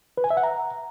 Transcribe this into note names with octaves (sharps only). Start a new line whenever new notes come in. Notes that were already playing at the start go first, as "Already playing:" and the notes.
B4
G#5
E5
F#5
A#5